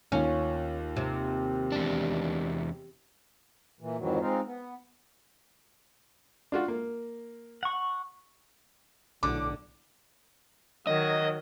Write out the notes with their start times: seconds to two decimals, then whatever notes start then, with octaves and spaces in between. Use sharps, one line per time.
0.12 D#2 C#4 F4
0.96 C3
1.72 E2 D4
3.80 A#2 E3
3.98 F2 G#2 D#3 E3 F#3
4.20 G#3 C4 D#4 F4
4.46 B3
6.52 D4 F4 F#4
6.68 A#3
7.63 F#5 C#6
9.23 B1 A2 D3 D6
10.87 D#3 F#3 D#5